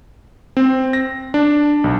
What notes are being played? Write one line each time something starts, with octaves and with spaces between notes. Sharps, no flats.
C4
A#6
D4
B1